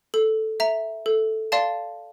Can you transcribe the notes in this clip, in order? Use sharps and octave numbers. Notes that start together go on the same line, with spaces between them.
A4
E5 A#5
A4
D5 F5 A5 C6